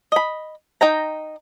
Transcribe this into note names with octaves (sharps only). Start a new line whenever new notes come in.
D#5 B5
D#4 G5 A#5